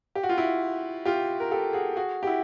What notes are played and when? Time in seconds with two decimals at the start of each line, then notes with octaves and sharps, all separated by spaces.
0.15 G4
0.23 F#4
0.29 F4
0.37 E4 F#4
1.06 F4 G4
1.40 A#4
1.51 G4 A4
1.73 F#4 G#4
1.96 F#4 G#4
2.23 G4
2.27 E4 F#4